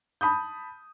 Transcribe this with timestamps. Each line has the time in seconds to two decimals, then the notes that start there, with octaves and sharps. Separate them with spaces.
0.21 A5 B5 D#6 G6